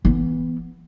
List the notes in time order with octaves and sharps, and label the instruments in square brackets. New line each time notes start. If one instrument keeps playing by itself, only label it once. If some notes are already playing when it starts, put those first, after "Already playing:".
[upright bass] E3 B3